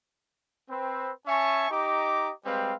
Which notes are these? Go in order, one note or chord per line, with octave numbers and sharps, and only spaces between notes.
C4 B4
C#4 E5 G#5 A5 C#6
D#4 G4 D#5 A#5 D6
G3 G#3 C4 B4 F5 G5